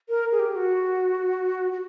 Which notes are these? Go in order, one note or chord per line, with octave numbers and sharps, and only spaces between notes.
A#4
G#4
G4
F#4
F#4